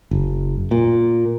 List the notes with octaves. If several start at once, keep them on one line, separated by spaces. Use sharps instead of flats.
F#1
A#2